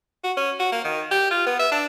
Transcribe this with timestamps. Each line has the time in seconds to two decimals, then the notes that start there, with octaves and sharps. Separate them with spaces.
0.24 F#4
0.37 C#4
0.59 F#4
0.72 A#3
0.84 D#3
1.11 G4
1.31 F4
1.46 B3
1.59 E5
1.72 D4